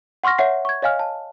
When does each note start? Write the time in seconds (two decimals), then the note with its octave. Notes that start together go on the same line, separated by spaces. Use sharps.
0.24 F#5 C6 C#6 F6 A#6
0.38 C#5 E5 F#5 C7
0.65 C#6 G#6
0.82 C#5 D#5 F5 G#5 F6
0.99 A5